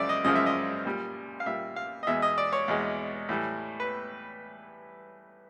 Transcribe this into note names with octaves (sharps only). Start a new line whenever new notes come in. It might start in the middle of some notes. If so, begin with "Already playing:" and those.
Already playing: F#2 C#3 F3 G#3 D5 E5
D#5
F#2 C#3 F3 G#3 D#5
E5
D#5
A#2 G3
F5
A#2 G3 E5
F5
D#5
E2 B2 G#3 E5
D#5
D5
C#5
E2 B2 G#3
A2 E3 G3
B4